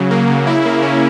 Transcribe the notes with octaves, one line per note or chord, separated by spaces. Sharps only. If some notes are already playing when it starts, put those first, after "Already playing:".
Already playing: C#3 F#3
A#3
C#3
E4
A#3
C#4